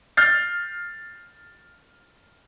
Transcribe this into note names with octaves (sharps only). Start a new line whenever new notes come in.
F6 G6 A6 C7